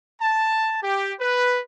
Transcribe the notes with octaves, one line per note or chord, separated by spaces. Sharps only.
A5
G4
B4